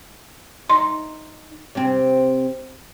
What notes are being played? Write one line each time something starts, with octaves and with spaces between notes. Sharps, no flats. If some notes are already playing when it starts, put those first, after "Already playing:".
D#4 C6
C3 C4